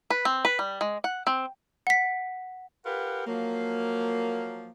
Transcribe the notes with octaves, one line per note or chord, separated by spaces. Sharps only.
B4
C4
B4
G3
G#3
F#5
C4
F#5 B6
F4 G4 A#4 B4 F#5
F3 F#3 A#3